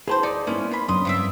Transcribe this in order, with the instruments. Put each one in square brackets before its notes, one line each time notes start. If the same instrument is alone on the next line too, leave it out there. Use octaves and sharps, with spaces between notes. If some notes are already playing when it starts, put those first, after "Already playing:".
[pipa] E3 C4 C5 [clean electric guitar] G#4 B4 A5
[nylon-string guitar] D2 [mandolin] D#4 [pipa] D5
[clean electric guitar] A#3 B4 C5 [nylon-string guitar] B3 D#4 E4 [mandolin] C#4
[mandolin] F4 B5
[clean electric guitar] F#2 [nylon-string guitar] C#3 D4 [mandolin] C6 D#6
[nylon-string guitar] G2 C4 [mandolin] E4 F4 E5